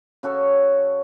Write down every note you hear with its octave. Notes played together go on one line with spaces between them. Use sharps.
C#3 F#4 A4 C#5